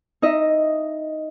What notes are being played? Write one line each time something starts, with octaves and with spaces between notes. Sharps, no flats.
D#4 D#5 E5